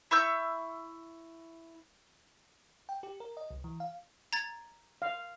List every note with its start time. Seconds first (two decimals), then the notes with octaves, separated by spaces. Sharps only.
0.11 E4 C#6 E6 G6
2.89 G5
3.03 G4
3.20 A#4
3.37 D#5
3.51 C2
3.64 E3
3.80 F5
4.33 A#5 G#6 A6
5.02 F5